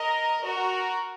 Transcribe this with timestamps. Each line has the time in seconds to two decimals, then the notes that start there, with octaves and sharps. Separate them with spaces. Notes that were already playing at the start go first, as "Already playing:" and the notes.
Already playing: A#4 D#5
0.45 F#4 A#4